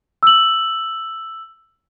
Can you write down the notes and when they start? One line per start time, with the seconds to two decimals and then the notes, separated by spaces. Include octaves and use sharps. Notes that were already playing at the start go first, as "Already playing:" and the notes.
0.23 E6 F#7